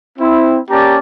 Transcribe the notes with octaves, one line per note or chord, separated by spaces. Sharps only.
C4 E4
A#3 C#4 G4 D5 A5 A#5